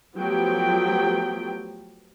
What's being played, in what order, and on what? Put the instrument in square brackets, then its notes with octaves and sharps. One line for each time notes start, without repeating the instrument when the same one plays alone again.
[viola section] F3 F#3 A3 B3 G4 G5